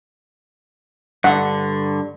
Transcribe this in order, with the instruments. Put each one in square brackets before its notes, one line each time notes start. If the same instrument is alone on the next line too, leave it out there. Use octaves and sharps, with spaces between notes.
[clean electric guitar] G2 D3 [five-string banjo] F#5